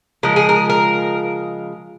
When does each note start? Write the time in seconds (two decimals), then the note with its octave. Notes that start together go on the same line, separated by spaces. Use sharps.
0.23 C#3 F3 G#3 A#4
0.36 G#4
0.49 A#4
0.70 A#4